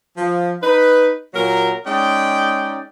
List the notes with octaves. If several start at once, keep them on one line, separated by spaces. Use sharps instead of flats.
F3
D#4 B4
A#2 F#3 A#4
G#3 C#4 D#4 D5 G5